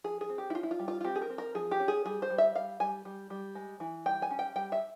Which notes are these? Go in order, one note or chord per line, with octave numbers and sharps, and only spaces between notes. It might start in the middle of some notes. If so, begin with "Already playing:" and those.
F3 G#4
G#4
C4
G4
E4
C#4 F4
E4
F4
G3
F4
F4
C4 G4
G#4
A#4
C4
A#4
F3 G#4
G4
C#4
G#4
G3 G#4
C5
G3
E5
G3 F5
G3 G#5
G3
G3
G#3
E3
G3 G5
G#5
C#4
G5
G3 G5
E5